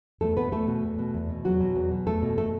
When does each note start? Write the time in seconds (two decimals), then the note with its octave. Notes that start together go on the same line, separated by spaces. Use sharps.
0.21 E2 A3 A4
0.37 B2 B3 B4
0.52 E2 A3 A4
0.67 B2
0.83 E2
0.99 B2
1.14 E2
1.29 B2
1.44 E2 F#3 F#4
1.60 B2
1.76 E2
1.91 B2
2.06 E2 A3 A4
2.22 B2
2.38 A3 A4